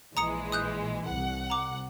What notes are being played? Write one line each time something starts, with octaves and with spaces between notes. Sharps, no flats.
A#1 E3 G#3 A#5 D#6 C#7
D#6 F#6 G6
C2 F#5
A#5 D6